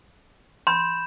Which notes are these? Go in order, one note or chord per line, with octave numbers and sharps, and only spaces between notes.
B5 C6 G6 E7